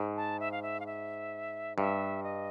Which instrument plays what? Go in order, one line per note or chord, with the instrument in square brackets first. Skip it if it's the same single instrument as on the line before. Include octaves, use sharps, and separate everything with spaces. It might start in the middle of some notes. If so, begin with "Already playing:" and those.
Already playing: [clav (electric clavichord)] G#2
[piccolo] A5
E5
F5
E5
F5
E5
[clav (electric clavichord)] G2 [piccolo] E5
[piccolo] D#5